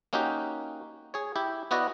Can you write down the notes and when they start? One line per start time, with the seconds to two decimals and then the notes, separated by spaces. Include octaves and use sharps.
0.13 A#3 C#4 D#4 F#4 G4
1.14 G#4 C#5
1.36 E4 G4
1.71 B3 E4 F#4 B4 D5 D#5